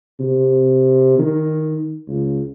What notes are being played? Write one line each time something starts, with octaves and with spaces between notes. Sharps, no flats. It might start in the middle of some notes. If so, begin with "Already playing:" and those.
C3
D#3
C#2